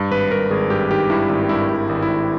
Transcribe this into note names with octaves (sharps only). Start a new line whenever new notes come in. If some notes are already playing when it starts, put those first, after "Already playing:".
Already playing: G2
G#1 B4
G2 A#4
G#1 G#4
G2 G4
D#3 G4
G2 E4
G#1 E4
G2 E4
G2
G4
G#1
E4
G#1